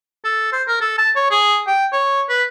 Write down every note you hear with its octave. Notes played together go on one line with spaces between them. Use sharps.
A4
C5
A#4
A4
A5
C#5
G#4
G5
C#5
B4